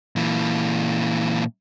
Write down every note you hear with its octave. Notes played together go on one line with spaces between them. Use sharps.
A#2 E3